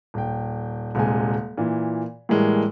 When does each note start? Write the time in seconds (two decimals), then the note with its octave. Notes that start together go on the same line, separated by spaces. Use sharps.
0.14 D#1 G5
0.95 D#1 C3 G#3 G#5
1.58 A#2 E3
2.29 A2 E3 G3 G#3 A#3